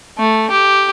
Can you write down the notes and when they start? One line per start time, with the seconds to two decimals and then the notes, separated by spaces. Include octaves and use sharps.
0.19 A3
0.50 G4